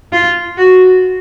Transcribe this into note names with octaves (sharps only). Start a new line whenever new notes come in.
F4
F#4